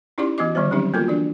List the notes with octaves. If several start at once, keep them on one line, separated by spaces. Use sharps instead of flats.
C#4 D#4 E4 G4 D5 C6
E3 B3 F#4 D#5 D6
D3 D#3 G3 B3 C5
F#3 G3 C4 C#4 D#4 G4
A#3 B3 F4 F#4 A4 A#4
E3 D4 D5